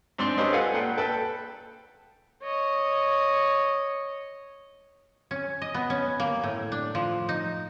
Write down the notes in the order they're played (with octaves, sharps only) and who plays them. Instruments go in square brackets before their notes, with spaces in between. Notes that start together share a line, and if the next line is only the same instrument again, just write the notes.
[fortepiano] G#2 C4 D4 C6
G3 C#4 D4 B4 C5 D#5
F4 A4 B4 F5 F#5 G#5
A#2 F#5 G5
A4 B4 G5 A5
[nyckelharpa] C#5 D#5
[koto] C#4
D#5
B3
C#4
A#3
A2
D4
F3
D#4